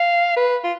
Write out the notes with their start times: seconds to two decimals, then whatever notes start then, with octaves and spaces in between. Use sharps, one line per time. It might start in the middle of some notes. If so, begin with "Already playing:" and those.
Already playing: F5
0.36 B4
0.64 F4